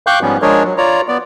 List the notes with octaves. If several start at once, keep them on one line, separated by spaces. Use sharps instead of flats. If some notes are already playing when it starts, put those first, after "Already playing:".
F5 G5 C#6 D6 F#6 G6
G#2 F3 G3 B3 C#4
F3 G#3 D4 G#4 A#4 C#5
F#3
F4 C#5 D5 A#5
B3 D5